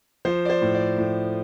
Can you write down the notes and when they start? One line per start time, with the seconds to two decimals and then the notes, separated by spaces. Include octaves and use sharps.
0.25 F3 C5
0.45 D5
0.50 C5
0.62 A2
0.74 D5
0.98 A2